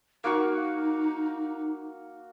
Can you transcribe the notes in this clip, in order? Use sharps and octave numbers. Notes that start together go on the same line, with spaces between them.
A#3 D#4 F#4 C#6